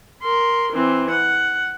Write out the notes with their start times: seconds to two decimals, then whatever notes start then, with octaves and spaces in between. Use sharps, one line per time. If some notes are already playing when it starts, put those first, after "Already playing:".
0.22 A#4 C6
0.72 E3 C4
1.10 F#5